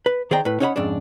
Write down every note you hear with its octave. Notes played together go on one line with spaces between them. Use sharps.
B4
D#3 G#4 C5 D5 G5 A#5
A2 B4
C#4 D#4 C#5 F#5 A5 B5
F2 G#2 C#3 D4